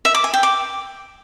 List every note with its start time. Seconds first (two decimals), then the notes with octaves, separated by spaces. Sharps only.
0.05 E5
0.14 D6
0.24 G#5
0.34 G5
0.43 D6